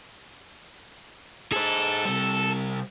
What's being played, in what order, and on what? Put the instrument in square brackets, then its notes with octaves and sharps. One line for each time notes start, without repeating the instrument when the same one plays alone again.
[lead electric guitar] G#4 C5 [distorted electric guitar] A4
[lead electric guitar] C3 G3